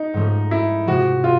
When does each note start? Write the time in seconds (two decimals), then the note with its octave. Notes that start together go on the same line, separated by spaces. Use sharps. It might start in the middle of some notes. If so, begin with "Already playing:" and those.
Already playing: D#4
0.14 G#2 F3 A3 C#4
0.51 E4
0.87 C3 F3 G#3 F#4
1.24 F4